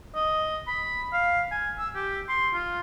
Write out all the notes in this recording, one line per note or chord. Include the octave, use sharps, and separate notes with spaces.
D#5
B5
F5
G#5
E6
G4
C6
F4